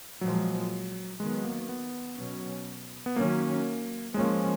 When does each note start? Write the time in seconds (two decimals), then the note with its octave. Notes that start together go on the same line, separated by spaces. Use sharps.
0.21 A#2 F3 F#3 G#3
1.19 D#3 F#3 G#3 B3
1.44 A#3
1.69 B3
2.18 B2 F#3 C#4
3.06 B3
3.16 D#3 F#3 A#3 C#4
4.14 F3 G#3 A#3 C#4